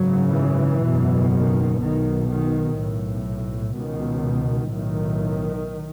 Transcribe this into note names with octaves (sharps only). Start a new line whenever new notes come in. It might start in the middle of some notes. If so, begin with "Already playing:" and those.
Already playing: G#1 F#2 C#3 F#3
E3
F#1 E2 B2
D#3
B1 B2 D#3
D#3
B1 A2
C#2 B2 D#3
B1 A2 D#3